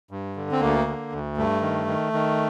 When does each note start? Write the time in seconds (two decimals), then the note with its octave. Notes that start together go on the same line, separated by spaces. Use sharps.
0.11 G2
0.36 D3
0.51 C4
0.61 D2 A#3
0.87 D3
1.12 D2
1.37 G2 A3
1.62 D#3
1.87 D#3
2.13 D#3